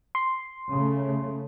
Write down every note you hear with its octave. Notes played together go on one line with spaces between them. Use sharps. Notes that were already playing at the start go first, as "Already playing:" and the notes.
C6
C#3 A3